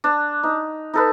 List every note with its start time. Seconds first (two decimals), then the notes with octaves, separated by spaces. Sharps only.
0.04 D4
0.43 D#4
0.94 D#4 A4 B4